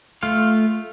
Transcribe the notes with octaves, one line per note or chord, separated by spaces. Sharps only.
A3 F4 F5